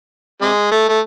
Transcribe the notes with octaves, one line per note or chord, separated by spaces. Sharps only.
C3 G#3
A3
A3